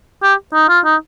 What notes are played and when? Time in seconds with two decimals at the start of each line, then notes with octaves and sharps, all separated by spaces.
0.23 G4
0.53 D#4
0.69 F4
0.85 D#4